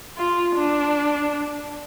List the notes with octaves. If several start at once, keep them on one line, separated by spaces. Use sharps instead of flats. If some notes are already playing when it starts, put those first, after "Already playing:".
F4
D4